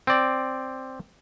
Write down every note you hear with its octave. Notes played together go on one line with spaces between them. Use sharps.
C4 D5